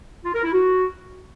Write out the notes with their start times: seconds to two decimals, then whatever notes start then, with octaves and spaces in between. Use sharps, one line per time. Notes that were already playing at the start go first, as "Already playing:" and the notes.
0.24 F4
0.34 A#4
0.43 E4
0.53 F#4